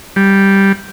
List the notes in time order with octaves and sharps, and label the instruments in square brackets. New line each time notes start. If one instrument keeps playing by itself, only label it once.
[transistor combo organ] G3